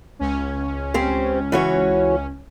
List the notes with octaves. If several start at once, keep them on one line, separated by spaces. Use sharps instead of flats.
C#2 C#4
C4 G4 C5
E3 F#4 C#5